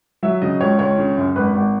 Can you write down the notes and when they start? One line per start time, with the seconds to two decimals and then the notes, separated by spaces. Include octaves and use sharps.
0.23 F#3 E5
0.42 C#3 D#5
0.61 C#2 C#5
0.79 C#2 C#5
0.98 C#3
1.17 F#2
1.36 G#1 B4
1.55 G#1